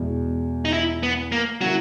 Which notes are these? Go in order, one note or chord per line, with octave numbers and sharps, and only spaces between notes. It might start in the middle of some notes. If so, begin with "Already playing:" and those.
Already playing: E2 B2 G#3
D#4
E4
B3
A#3
C#3 E3 F#3 A#3 E4